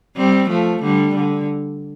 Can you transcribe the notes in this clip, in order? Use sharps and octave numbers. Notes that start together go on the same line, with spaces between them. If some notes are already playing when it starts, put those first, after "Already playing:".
G3 C4
F3 A3
D3 G3
D3